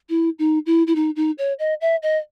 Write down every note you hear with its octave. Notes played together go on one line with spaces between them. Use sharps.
E4
D#4
E4
E4
D#4
D#4
C#5
D#5
E5
D#5